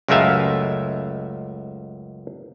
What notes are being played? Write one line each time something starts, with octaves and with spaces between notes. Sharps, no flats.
C#2 F#2 G#3 A3 E5 F5